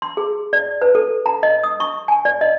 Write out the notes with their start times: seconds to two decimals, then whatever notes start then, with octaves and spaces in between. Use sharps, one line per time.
0.02 C6
0.17 G#4
0.53 D5
0.82 B4
0.95 A4
1.26 A#5
1.43 D#5
1.64 D#6
1.80 C#6
2.08 G#5
2.25 D5
2.41 D#5